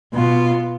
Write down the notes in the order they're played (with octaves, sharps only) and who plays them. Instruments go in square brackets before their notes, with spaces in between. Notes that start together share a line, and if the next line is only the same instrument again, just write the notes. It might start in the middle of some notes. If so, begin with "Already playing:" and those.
[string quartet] B2 B3 F4